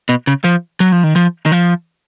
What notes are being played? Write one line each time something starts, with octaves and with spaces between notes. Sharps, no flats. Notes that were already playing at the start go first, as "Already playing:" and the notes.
B2
C#3
F3
F#3
F3
D#3
F3
D#3
F3